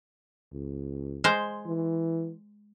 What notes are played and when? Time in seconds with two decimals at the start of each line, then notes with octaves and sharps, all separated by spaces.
0.53 C#2
1.24 G#3 C5
1.67 E3